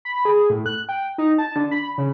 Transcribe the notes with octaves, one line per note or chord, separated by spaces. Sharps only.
B5
G#4
A2
F#6
G5
D#4
A5
D3
B5
C#3